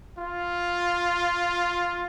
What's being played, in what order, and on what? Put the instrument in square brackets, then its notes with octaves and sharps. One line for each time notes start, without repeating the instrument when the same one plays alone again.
[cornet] F4